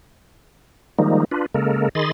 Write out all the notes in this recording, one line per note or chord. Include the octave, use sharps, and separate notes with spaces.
D#3 F3 G3 G#3 A#3 D#4
D4 F4 B4
C#3 G#3 A#3 A4 A#4
D#3 G#4 D#5 B5 C6 A6